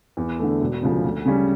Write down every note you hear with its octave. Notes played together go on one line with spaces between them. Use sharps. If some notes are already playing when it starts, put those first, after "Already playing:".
E2
D3 A3
E1
D2 C#3 F3
D2
C#3 G3 C#4